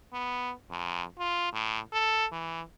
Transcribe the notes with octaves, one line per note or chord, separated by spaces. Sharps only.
B3
F2
F4
A2
A4
E3